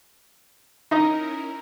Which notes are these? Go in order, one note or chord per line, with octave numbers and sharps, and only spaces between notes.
C#4 D#4 E4 A#4 D#5